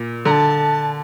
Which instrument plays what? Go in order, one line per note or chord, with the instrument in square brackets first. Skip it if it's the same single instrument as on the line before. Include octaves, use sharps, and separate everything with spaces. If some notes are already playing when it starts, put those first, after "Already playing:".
Already playing: [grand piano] A#2
[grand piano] D3 [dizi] A5 A#5